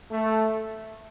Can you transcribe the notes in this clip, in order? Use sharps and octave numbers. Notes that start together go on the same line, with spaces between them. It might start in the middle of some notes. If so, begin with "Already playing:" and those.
A3